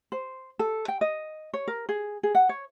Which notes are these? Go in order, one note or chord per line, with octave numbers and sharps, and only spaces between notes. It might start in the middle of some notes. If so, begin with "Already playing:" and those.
C5
A4
G5
D#5
C#5
A#4
G#4
G#4
F#5
C#5